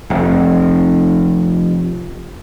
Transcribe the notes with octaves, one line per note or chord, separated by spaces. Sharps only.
F1 F2